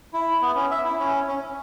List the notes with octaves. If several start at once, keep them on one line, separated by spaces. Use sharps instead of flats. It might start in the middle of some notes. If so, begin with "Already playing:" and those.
E4
B3
C#4
E5
E4
C#4
C#4